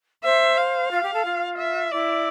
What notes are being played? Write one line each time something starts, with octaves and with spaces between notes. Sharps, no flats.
C5 E5
F5
F4
G4
A4
F4
E5
E4 D5